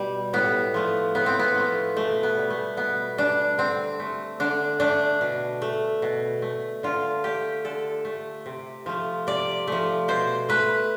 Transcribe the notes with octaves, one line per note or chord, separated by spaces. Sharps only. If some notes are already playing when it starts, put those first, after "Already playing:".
Already playing: B2 G3
A2 B3
F3 A3
A2 B3
C4
B3
F3 A3
B2 A3
B3
G3
A3
B2 B3
G3 D4
D3 C4
A3
D3 D4
A3 D4
B2
A3
B2
A3
D3 F4
A3 G4
D3 A4
A3
C3
F3 A3
C3 D5
F3 A3
B2 C5
A3 B4